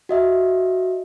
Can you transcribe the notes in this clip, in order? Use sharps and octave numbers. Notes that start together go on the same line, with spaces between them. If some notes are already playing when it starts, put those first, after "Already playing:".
F#4 D#5 E5